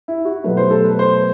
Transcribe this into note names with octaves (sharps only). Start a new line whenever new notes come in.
E4
F#4
B2 F#3 A3 B4
C5
A4
B4
C5